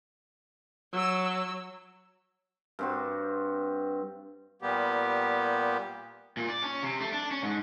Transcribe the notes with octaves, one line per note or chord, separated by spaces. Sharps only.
F#3 E6
G2 C4 F#4
A#2 G3 A#3 B3 G4
A#2
D5
C#4
C3
A3
D4
C#4
G#2